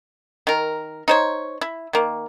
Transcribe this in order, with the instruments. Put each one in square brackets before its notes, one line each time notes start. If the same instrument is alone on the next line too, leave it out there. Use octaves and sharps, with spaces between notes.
[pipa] D#3 A#4
D#4 C5 C#5
E4
D#3 A#3